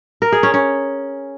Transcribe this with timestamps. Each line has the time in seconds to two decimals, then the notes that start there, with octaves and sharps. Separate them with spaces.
0.22 A#4
0.32 G#4
0.43 C#4
0.54 C#4